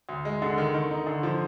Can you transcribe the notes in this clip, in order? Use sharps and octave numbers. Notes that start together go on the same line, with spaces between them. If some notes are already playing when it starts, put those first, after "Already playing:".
D2
G#3
D3
D#3
D#3
D#4
D3
F3